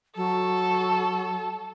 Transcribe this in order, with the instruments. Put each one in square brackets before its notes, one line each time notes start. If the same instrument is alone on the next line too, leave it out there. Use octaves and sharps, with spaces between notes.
[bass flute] F#3 [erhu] A4